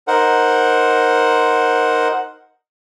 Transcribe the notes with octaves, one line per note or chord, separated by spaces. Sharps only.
D#4 A#4 C5 F#5